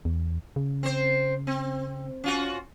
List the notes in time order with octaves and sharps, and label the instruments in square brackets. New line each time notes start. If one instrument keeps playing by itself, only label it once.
[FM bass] E2
C#3
[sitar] C4 C5
C4
C#4 F4 F#4